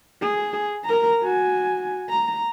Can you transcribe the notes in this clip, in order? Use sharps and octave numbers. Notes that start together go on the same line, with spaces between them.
G#4
A#4 A#5
F#4 G#5
A#5